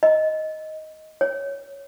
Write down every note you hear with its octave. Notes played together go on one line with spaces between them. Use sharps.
D#5
C#5